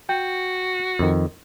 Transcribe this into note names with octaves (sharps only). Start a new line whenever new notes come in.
F#4 G5
F2 D#3